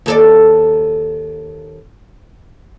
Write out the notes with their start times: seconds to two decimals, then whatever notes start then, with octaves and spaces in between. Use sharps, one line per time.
0.06 D#2 A4 D5